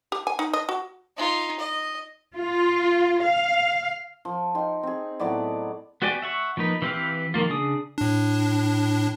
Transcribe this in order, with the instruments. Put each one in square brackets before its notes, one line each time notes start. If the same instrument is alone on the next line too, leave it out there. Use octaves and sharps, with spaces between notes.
[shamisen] G4
G#5
D#4
D#5
F#4
[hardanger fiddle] D#4 F4
D#5
[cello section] F4
F5
[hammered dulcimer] F3
D#4 G5 C6
C4 G#4
A2 F#3 B3 D5
[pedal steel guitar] B3 F#4 G4 D5 G#5
E5 F#5 C#6
F3 A#3 D#4 B4
E3 C4 G4 B4 F5
D#3 F3 A#3 F4
C#3 D4 G#4 D#6
[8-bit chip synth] A2 D4